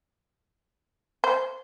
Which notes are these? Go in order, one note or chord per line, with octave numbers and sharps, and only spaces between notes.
C5